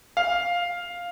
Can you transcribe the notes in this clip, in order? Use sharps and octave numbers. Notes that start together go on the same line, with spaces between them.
F5